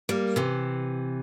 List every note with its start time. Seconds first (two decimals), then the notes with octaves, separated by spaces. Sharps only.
0.09 G3 A#3
0.36 C3 E3